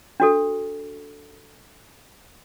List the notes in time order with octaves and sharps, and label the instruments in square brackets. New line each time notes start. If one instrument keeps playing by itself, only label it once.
[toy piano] D4 F#4 A4